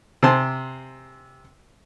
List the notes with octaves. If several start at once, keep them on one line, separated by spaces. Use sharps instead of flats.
C3 C5 G#5 A5 C6